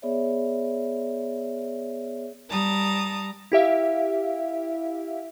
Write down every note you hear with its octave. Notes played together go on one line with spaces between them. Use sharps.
B3 G#4 C#5 D5 E5
G3 A5 A#5 D#6
E4 G4 E5 F5